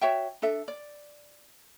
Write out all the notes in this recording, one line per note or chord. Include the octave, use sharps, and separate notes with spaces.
F#4 C#5 E5 G5
D4 A4 E5
D5